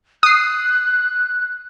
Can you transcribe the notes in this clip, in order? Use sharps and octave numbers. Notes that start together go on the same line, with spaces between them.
D#6 F#6 C7